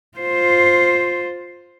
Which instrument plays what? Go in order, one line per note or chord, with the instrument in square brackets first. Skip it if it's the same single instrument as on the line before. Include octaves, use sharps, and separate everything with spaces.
[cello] F4 C5